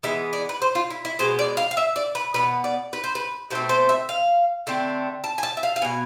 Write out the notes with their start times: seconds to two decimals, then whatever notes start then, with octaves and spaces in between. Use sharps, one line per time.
0.03 E3 G#3 B3 E4
0.33 D5
0.49 B4
0.62 C5
0.75 F4
0.90 E4
1.05 E4
1.19 B2 G#3 B3 C5
1.39 D5
1.57 F5
1.71 F5
1.77 E5
1.96 D5
2.15 B4
2.34 B2 B3 B4
2.64 D5
2.93 B4
3.04 C5
3.15 B4
3.50 B2 A3 C4 C5
3.69 C5
3.89 E5
4.09 F5
4.67 D3 A3 C4
5.24 A5
5.38 G#5
5.43 A5
5.57 E5
5.63 F5
5.76 F5
5.82 B2 B3 G#5